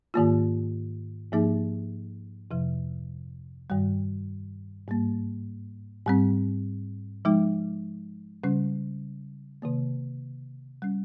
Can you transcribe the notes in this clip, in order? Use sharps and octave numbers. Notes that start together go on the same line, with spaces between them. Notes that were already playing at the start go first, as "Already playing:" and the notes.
G#2 D#3 A#3 F4
G#2 F3 A#3 D#4 G#4
F2 C3 F3
G2 D#3 G3
G#2 G3 A#3
G#2 G3 C4
F3 G#3 D#4
C#3 G3 C#4
C3 D#3 A#3
G3 C#4